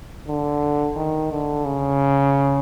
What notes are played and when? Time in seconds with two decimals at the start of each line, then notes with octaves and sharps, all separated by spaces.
0.28 D3
0.96 D#3
1.32 D3
1.65 C#3